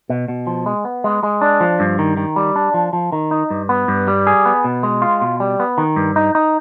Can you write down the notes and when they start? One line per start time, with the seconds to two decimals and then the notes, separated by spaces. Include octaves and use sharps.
0.09 B2
0.28 B2
0.47 F3
0.66 G#3
0.85 B3
1.04 G#3
1.23 G#3
1.41 D4
1.61 F3
1.80 G2
1.99 D#3
2.17 D#3
2.36 G3
2.56 D4
2.74 F3
2.93 F3
3.12 D#3
3.31 D#4
3.50 G2
3.69 B3
3.88 G2
4.08 G3
4.27 G#4
4.45 B3
4.64 B2
4.83 G#3
5.02 F4
5.21 B2
5.40 G3
5.60 B3
5.78 D#3
5.96 G2
6.16 D#4
6.35 D#4